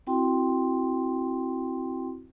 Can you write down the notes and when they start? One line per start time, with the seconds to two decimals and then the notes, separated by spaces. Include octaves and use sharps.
0.07 C4 E4 F#4 G5 C6